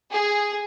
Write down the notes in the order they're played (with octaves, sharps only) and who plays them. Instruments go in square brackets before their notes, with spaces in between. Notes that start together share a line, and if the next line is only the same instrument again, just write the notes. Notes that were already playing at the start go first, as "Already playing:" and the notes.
[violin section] G#4